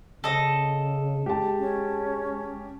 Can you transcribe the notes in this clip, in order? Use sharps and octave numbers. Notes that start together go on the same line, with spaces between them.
C#3 A4 D#5
G#3 G4 A5
C#4